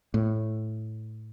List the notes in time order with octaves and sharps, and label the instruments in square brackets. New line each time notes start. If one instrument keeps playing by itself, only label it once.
[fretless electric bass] A2